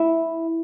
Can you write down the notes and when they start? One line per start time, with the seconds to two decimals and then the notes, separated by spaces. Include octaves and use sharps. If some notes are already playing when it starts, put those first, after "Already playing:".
Already playing: E4